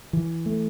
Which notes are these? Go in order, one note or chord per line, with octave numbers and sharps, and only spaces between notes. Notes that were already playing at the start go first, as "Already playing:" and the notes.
E3
A3